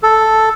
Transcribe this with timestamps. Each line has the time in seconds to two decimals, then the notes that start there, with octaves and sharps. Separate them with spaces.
0.03 A4